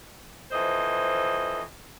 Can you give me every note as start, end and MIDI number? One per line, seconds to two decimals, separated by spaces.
0.51 1.62 41
0.51 1.62 52
0.51 1.62 72
0.51 1.62 75